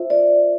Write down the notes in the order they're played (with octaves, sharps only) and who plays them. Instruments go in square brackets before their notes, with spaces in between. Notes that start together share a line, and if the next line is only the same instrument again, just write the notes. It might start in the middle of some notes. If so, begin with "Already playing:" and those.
Already playing: [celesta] F4 C5 E5
[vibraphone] D5